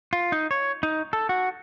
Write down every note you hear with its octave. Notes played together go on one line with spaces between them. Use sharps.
F4
D#4
C#5
D#4
A4
F#4